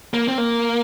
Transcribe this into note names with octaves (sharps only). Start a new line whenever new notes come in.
A#3
C4
A#3